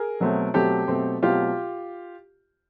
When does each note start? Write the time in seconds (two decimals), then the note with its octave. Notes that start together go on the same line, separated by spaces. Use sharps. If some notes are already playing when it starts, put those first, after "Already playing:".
Already playing: G#4 A#4
0.20 B2 F#3 A3 C4
0.54 B2 F#3 A3 C4 G4 A4
0.88 B2 F#3 A3 C4
1.22 B2 F#3 A3 C4 F4 G4